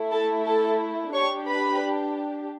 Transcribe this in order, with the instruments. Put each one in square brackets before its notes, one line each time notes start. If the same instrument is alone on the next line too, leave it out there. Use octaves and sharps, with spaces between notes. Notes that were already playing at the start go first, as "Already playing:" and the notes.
Already playing: [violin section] A3 E4
A4 A5
A4 A5
D4 G4 C#5 C#6
B4 B5